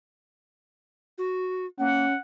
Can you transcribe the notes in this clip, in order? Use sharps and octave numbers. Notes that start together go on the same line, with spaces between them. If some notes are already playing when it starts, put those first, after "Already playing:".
F#4
A#3 C#4 F#5